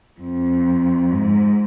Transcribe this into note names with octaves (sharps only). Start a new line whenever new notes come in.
F2
G#2